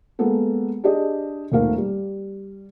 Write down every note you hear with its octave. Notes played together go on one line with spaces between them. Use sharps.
G#3 A#3 B3 A4
D4 G4 G#4 D#5
D#1 B1 A3 A#3 A#4 F5
G3